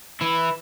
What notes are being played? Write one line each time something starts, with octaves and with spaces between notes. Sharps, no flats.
E3 E4